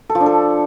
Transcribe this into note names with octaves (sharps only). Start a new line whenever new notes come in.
A4
F3
D4
A4